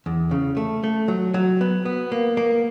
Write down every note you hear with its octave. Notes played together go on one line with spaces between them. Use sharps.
E2
C#3
A3
A3
F#3
F#3
B3
B3
A#3
A#3